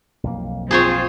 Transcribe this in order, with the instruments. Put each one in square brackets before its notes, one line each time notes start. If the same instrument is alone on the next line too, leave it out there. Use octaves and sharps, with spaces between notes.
[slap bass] B1 F2 A#3
[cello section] C4 F4 [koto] G#4 C5 C#5